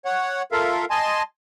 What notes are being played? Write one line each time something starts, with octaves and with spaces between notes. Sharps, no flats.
C#5 F#5
F4 A4 A#4 E5 F5
D#5 G#5 A5 C6